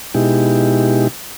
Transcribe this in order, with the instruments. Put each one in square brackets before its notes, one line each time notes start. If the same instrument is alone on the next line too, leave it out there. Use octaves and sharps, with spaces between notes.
[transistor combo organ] B2 G#3 D#4 E4 G4